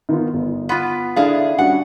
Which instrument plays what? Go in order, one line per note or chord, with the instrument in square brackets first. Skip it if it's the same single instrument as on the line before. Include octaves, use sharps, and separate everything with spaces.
[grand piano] D#3 B3 F4
G1
[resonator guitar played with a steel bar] B3 F4 [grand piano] C6 B6
[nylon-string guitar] D3 D4 E4 [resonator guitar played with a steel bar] G#4 F5
[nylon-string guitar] G3 C#4 [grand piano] D4 F#4 [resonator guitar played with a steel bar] F#5